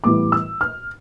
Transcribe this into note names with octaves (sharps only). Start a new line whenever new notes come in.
A2 E3 G3 B3 E4 D6
E6
F6